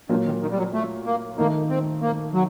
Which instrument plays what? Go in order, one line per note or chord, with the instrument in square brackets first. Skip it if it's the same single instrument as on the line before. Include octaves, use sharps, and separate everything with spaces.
[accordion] G2 [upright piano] A#2 F#3 A#3
[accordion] D#3
D#3
G3
F#3
A3
A#3
[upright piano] D#3 A3 D#4 [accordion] A#3
[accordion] C4
A#3
F#3